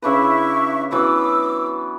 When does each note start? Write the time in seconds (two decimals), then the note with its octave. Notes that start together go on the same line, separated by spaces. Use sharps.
0.02 C#3 D4 E4 B4 E5 C#6
0.91 E3 F#3 B3 D6 E6